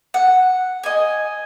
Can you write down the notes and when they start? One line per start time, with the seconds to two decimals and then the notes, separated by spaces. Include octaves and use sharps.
0.14 F#5
0.83 D#5 G#5